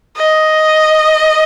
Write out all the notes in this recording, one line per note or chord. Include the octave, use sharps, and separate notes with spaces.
D#5